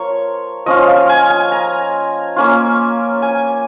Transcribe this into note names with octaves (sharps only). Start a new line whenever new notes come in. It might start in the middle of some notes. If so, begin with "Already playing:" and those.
Already playing: F3 F4 A#4 C#5
F3 C#4 F4 D#5
F5
G#5
G#5
A#5
A#3 C#4 F4
G#5